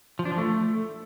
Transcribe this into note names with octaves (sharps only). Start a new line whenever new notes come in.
F3
D4
F3
A3